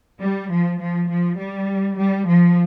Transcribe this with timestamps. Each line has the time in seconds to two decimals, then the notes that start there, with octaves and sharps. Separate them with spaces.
0.21 G3
0.51 F3
0.80 F3
1.09 F3
1.38 G3
1.97 G3
2.27 F3